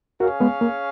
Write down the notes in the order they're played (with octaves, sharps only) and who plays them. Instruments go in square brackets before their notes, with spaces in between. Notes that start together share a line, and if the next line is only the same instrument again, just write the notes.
[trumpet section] C#4 G#4 C#5 F5 [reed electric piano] F#4 A#4
[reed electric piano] G#3 B3
A#3